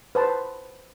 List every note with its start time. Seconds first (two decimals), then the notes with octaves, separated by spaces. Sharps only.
0.15 B4 C5 A5